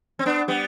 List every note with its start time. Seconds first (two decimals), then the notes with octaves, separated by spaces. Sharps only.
0.19 C4
0.26 B3 D4
0.48 G3 B3